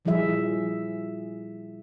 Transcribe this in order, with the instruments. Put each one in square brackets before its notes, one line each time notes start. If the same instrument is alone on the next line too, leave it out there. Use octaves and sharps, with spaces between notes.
[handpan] A#2 F3 G3 E4 G#4 E5